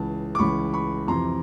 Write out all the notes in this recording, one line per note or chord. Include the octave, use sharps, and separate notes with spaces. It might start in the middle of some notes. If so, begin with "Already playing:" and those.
Already playing: C#2 C#3 E3 A5
D6
C#2 C#3 E3 B5 C#6
B5 C#6
F2 C3 E3 A#5 C6